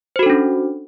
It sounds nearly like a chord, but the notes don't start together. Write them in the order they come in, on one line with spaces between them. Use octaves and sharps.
C5 F#4 A4 D4 C#4